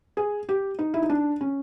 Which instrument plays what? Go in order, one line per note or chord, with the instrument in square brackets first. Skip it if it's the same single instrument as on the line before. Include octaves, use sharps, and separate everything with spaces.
[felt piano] G#4
G4
D#4
E4
D#4
D4
C#4